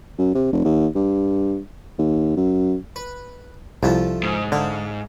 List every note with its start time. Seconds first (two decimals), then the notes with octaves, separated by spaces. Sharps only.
0.18 F#2
0.35 C3
0.52 F1
0.64 D#2
0.95 G2
1.98 D#2
2.37 F#2
2.96 B4
3.83 C2 F3 A3 F4
4.23 G#2
4.52 D3 F5